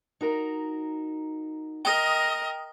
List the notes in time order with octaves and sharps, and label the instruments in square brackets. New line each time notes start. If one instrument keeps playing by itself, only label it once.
[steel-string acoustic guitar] D#4 F#4 A#4
[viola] A#4 D#5 [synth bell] G5 D#6